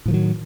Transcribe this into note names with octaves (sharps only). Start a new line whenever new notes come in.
A2 D#3 F3 F#3